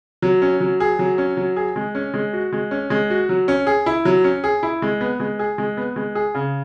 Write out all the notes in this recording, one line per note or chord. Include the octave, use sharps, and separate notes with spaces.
F#3
C#4
F#3
G#4
F#3
C#4
F#3
G#4
G#3
C#4
G#3
F#4
G#3
C#4
G#3
F#4
F#3
C#4
G#4
E4
F#3
C#4
G#4
E4
G#3
B3
G#3
G#4
G#3
B3
G#3
G#4
C#3